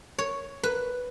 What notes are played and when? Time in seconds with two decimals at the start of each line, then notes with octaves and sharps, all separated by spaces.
0.19 C#5
0.63 B4